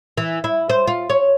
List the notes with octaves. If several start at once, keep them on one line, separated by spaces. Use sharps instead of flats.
E3
E4
C5
F4
C#5